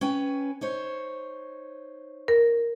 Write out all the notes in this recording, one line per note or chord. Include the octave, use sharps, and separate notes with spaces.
C#4 B4 G5
D#4 C5 C#5
A#4